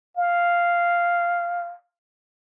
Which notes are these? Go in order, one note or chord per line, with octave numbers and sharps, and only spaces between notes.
F5